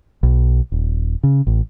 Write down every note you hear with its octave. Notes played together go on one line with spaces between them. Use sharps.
B1
D#1
C#3
A1